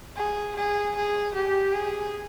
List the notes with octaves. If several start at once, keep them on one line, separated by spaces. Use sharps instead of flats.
G#4
G#4
G#4
G4
G#4